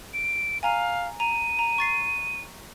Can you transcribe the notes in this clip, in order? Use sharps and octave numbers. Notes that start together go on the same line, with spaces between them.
D7
F5 G#5 A#5 D#7
A#5 D#7
A#5
C#6 A6 C7